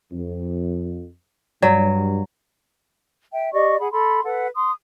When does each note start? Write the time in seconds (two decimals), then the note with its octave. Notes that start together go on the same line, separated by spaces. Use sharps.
0.12 F2
1.62 G2 F#3 C#5 D5
3.33 E5 G5
3.53 G4 D5 D#5 C#6
3.79 G#4 F#5 B5
3.92 A4 B5 C6
4.24 A4 B4 F#5
4.55 C6 D#6